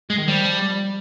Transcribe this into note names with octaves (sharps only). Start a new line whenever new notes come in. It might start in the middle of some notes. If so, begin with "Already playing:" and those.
G#3
D#3
F3 G3
F3
G3
G3